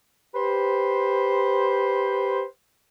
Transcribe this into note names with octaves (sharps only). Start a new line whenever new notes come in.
G4 B4 C5